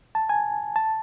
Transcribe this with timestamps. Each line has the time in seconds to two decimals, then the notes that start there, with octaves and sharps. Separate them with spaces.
0.15 A5
0.29 G#5
0.76 A5